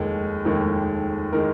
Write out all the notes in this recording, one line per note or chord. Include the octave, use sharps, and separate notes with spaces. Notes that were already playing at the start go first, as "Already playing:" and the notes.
Already playing: F1 D#2 D#3 G#3
F1 D#2 D#3 G#3
D#3 G#3 A#4